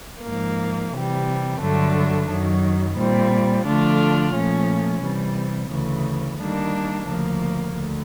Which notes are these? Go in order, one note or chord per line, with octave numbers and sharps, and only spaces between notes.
G#2 F3 A#3
C3 E3 G3
G2 D3 F#3 A3 D4
F#2 D#3 F#3
A#2 G3 C4
D3 F3 A3 D4 F4
A#2 F3 A3 C#4
C3 E3 G3
D2 C#3 E3
D#3 G3 A#3 D4
D2 C#3 F3 A#3
D2